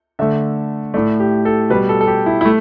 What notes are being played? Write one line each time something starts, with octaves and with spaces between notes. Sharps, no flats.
D3 A3 E5
A2 A3 D5
G4
A4
B2 G3 B4
A4
A4
G4
E4
E4
A3